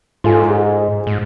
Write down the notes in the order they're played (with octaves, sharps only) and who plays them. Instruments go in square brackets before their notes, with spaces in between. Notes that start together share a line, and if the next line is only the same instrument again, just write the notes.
[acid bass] G#2 [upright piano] F4 A4 G#5
[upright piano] G#4
[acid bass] G#2